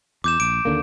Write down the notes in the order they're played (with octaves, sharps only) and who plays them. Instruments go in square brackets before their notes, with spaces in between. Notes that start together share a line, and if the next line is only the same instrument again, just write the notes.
[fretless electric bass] E2 [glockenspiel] D6 G6 E7
[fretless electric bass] A#1 [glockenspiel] D7
[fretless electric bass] D#2 D3 A#3